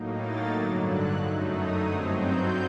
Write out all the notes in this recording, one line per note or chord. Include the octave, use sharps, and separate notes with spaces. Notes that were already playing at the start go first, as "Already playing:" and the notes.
Already playing: A2 F#3 A#3 D#4
A6
G2 D3 F#3
F#6
F#2 F#3 A3 D#4
D#6
G2 F#3 C4 D#4 D#6
G6